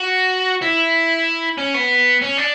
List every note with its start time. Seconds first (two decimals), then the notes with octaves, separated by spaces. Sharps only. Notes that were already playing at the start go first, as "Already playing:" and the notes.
Already playing: F#4
0.62 E4
1.58 C#4
1.74 B3
2.22 C#4
2.37 D4